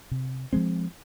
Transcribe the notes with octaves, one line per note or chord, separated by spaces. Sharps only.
C3
F3 G#3 C4